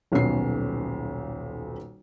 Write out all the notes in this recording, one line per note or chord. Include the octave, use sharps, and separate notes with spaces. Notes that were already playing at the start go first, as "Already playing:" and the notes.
D#1 B1 B2 C#4 C7